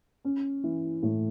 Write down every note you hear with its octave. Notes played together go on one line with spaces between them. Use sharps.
C#4
E3
A2